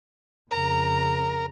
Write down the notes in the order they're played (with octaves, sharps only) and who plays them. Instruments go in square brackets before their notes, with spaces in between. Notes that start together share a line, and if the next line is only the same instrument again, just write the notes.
[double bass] F2 C#3 [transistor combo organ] A#4 [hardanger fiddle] A#5